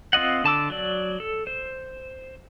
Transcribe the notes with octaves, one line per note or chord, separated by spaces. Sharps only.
C4 F4 D#5 F#5
D3 A5 D6 E6
F#3 D5
A4
C5